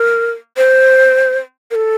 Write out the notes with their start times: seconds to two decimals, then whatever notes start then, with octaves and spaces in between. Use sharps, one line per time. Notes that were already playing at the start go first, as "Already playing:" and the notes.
Already playing: A#4
0.57 C5
1.71 A#4
1.75 A4